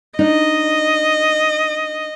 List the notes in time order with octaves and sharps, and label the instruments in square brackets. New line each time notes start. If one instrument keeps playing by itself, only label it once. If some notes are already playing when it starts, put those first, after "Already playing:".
[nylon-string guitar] D4 D#4 [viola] D#5